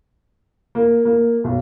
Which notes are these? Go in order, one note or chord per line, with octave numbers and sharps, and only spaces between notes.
A#3
A#3
B1